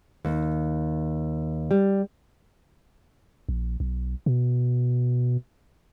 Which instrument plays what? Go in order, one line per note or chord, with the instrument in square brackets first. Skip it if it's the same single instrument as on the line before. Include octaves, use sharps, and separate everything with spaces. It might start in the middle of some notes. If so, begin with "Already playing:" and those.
[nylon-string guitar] D#2
G3
[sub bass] A#1
B1
B2